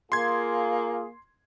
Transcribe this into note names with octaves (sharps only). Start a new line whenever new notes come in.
A#3 F4 G#4 C6 G#6